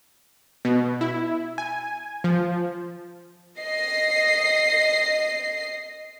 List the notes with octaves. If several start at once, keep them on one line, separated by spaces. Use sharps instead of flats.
B2
E4
G#5
F3
D#5 C7